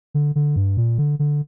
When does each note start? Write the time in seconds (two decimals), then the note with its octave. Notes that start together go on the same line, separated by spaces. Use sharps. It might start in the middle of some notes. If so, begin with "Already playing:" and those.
0.14 D3
0.36 D3
0.56 G2
0.77 A#2
0.98 D3
1.19 D3